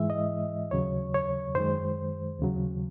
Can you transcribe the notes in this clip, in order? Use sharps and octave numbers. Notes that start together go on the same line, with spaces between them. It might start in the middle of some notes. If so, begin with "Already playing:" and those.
Already playing: G#2 E3 G#3 E5
D#5
D#2 C#3 F#3 C#5
C#5
F#2 D#3 G#3 C5
D#2 C#3 F#3